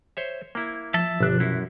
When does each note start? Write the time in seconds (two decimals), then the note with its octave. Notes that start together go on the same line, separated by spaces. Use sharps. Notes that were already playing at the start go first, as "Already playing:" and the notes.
0.17 C5 C#5 E5
0.55 A#3 E4
0.94 F3 E5 A5
1.20 G1 B2 F3 D4 F#6
1.40 F#2 E4